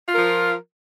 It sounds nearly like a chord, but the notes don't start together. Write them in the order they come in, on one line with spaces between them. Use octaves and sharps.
F4 A#4 F3